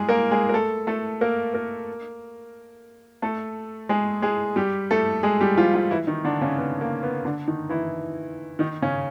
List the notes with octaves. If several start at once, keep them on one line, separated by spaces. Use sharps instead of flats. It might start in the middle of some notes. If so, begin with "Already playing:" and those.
Already playing: G3 G#3 G#4
A#3 A#4
G#3 G#4
A#4
A3 A4
A3 A4
A#3 A#4
A#3 A#4
A3 A4
G#3 G#4
G#3 G#4
G3 G4
A3 A4
G#3 G#4
G3 G4
F3 F4
F3 F4
E3 E4
D#3 D#4
D3 D4
C#3 C#4
B3
A#3
B3
D3 D4
D#3 D#4
E3 E4
D#3 D#4
C#3 C#4